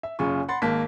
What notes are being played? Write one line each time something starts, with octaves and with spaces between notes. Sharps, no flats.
E5
F#1 F#2 C#3 F4 G#5 C#6
F#5 B5 C6 A6
G#1 A#3 A5 B6